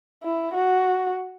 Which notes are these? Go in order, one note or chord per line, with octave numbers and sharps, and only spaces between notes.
E4
F#4